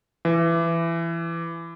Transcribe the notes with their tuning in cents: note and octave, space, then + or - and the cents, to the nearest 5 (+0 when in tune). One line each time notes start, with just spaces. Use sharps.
E3 +20